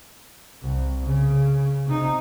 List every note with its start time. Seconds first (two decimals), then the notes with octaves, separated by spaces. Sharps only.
0.63 C2
1.04 C#3
1.86 C3 D#4